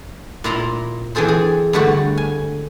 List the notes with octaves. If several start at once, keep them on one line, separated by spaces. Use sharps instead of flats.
A#2 E4 A#5 C6
E3 C4 G#4 A4 C5
G#4
G2 D3 A3 F#4
G#5